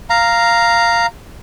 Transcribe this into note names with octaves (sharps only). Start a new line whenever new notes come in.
F5 A#5